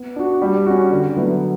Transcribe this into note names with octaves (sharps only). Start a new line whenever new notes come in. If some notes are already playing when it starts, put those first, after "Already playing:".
Already playing: B3
D4 F#4
G3
C#4 F#4
D3
F#3 B3 E4